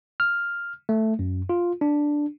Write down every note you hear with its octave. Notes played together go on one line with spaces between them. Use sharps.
F6
A3
F#2
F4
D4